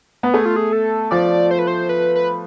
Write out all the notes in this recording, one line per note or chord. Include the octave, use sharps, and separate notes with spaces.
B3
A3 G#4
F4
G#4
A4
F3 D5
C5
B4
C5
B4
B4